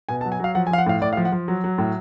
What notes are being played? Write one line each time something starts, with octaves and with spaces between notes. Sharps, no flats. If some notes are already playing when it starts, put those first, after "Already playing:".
B2 G#5
A5
F#3
G#5
F#3 F5
F3 F#5
G#5
F3 F5
F#5
A2 F5
A2 D5
F5
F3
F#5
F3
F#3
F#3
A2